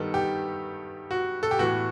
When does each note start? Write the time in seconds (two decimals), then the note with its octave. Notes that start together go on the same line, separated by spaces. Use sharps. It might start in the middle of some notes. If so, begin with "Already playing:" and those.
Already playing: G2 D#3 G3 B3 A4
0.14 G4
1.11 F#4
1.43 A4
1.51 G4
1.59 A2 E3 B3 F#4